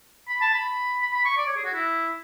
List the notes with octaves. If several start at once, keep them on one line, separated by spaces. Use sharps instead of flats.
B5
A5
B5
B5
B5
C#6
D5
C#5
G#4
F#4
E4